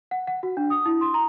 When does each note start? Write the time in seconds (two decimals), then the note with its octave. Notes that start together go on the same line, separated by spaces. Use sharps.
0.11 F#5
0.27 F#5
0.43 F#4
0.57 D4
0.70 D#6
0.86 E4
1.01 C6
1.14 A#5